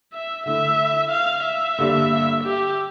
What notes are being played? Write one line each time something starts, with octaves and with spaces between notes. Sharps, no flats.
E5
D3 A3 E4 E5
F5
E5
G2 D3 G3 A#3 D4
G4